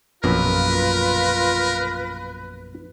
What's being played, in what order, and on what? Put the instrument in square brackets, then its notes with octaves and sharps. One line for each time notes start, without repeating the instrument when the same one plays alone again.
[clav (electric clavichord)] A#1 F#2 B2 [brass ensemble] F4 [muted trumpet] A#4 [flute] B4